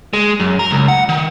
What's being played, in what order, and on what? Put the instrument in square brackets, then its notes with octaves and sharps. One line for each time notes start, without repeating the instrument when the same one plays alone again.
[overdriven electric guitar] G#3
F#2
A#4
C#2
F#5
D#3